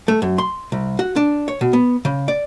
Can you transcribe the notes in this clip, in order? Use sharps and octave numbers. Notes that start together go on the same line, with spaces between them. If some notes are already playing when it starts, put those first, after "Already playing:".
A3
F#2
C6
C2
F#4
D4
C#5
B2
B3
C#3
D5